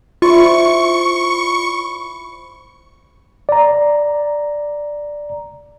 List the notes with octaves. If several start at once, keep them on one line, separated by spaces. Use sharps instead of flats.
E4 F4 C5 D5 C#6
D5 A#5